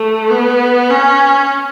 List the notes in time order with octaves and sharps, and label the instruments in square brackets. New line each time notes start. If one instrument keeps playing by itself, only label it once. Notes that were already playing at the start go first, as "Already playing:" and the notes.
Already playing: [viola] A3
B3
C#4